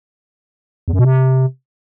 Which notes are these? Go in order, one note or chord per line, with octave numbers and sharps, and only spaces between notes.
E2
F#2
B2
C3